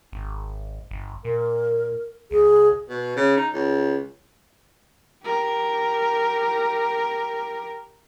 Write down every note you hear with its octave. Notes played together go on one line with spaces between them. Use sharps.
G#1
G1
A#2 A#4
C#2 G#4
B2
C#3
D#4
C#2
G4 A#4